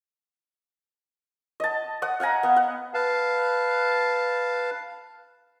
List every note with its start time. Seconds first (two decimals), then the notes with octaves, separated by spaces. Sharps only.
1.60 D#5 A5
2.02 F#5 D#6
2.20 F5 F#5 G#5 A#5
2.43 B3
2.56 F#5
2.94 B4 F5 A5